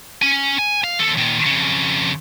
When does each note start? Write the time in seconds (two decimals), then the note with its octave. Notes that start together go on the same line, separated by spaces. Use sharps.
0.22 C#4 G#5
0.59 G#5
0.84 F5
0.99 D#2 A4
1.18 A#2 D#3
1.46 F2 C#3